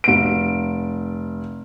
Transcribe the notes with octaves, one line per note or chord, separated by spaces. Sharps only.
F1 D7